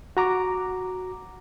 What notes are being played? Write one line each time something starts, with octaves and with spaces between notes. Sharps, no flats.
F#4 A#5 D6